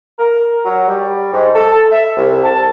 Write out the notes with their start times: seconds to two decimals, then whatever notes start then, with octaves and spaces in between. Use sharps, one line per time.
0.19 A#4
0.65 F#3
0.87 G3
1.33 G#2
1.55 A4
1.91 E5
2.17 C2
2.44 A5